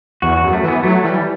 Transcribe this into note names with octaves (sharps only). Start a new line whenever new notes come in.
E2 F#4
F#4
F#2
A3
E3 B3
F#3 A3
E3 G3